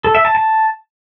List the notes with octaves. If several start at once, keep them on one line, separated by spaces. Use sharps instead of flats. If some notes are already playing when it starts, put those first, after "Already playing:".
A4
E5
A5
A5